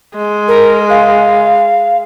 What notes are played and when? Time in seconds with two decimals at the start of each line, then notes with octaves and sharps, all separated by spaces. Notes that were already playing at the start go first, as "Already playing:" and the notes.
0.16 G#3
0.48 A#4
0.90 F5